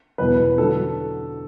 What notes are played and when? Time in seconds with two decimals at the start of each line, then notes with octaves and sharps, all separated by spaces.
0.18 E2 B2 F#3 B4
0.58 D3 F#3 A4